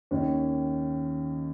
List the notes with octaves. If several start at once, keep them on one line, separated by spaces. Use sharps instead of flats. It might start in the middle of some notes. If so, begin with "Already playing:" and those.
D#2 D#3 C#4